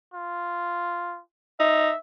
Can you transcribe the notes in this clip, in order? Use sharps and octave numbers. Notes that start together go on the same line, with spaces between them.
F4
D#4 E5